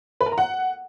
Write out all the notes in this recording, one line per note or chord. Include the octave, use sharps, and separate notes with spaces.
B4
A#4
A#5
F#5